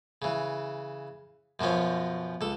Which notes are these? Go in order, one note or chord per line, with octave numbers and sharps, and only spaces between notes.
C#3 E3
F#2 B2 F3 C#4
C#2 A4